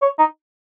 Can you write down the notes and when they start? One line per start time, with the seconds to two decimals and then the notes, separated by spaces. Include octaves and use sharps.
0.02 C#5
0.19 D#4